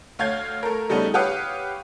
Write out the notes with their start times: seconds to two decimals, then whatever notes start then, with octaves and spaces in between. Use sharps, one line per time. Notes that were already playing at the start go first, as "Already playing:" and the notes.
0.19 D2 C#5 F5 F6 G6 G#6
0.63 A3 A#4
0.89 C#3 G3 A3 B3 D#4
1.14 G4 B4 C#5 F5 F#5 D#6